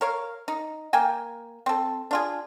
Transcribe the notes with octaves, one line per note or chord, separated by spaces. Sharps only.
A#4 C#5 F5
D#4
A#3 G5 G#5
C4 A4
D4 F4 G#4